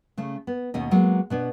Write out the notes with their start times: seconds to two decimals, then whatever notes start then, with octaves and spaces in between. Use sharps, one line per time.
0.18 C#3 A3 C#4
0.47 B3
0.74 D#2 B2 A3 C#4 D#5
0.91 F#3 G#3 A#3 B3
1.30 B2 B3 D4